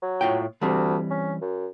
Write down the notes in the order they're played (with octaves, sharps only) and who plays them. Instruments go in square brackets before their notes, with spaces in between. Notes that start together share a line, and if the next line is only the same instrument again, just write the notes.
[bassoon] F#3
[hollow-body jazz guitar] A2 F4 G5
[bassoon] D2 [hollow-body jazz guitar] E3 G3 C4
[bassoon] C#4
F#2